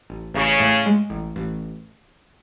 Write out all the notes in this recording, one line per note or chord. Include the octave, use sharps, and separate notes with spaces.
A1
A1 C#3
A2
G#3
A1
A1